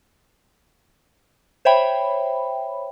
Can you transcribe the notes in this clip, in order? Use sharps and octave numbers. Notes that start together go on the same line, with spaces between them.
C5 C#5 E5 G5 B5